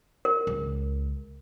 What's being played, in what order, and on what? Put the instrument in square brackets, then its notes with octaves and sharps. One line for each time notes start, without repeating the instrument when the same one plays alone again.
[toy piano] A#4
[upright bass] C#2